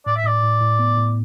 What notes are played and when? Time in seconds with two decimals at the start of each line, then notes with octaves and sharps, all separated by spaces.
0.06 A2 D5
0.17 E5
0.24 A2 D5
0.43 A2
0.61 A2
0.79 B3
0.97 A2